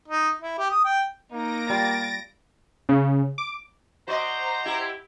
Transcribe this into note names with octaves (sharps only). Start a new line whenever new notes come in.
D#4
E4
G4
D#6
G5
A#3 D#4 A#6 D7
G3 F4 A6
C#3
D6
F#4 C5 D5 D#5 A#5
E4 G4